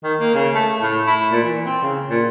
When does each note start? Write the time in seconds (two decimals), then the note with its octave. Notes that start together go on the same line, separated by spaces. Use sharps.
0.03 D#3
0.20 A#3
0.34 C#3
0.54 A3
0.82 A2
1.07 E4
1.32 A#2
1.44 E3
1.65 C4
1.83 C#3
2.10 A#2